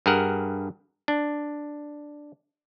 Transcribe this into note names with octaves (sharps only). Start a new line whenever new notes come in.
G2 G#4 A#4 F#5
D4